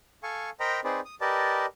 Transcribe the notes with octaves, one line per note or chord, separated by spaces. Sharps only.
A4 F5 G#5 C#6
A#4 C5 D#5 G5 A#5 B5
C4 D#4 G#4 B4 C5 D5
D#6
G4 A#4 B4 D5 D#5 A5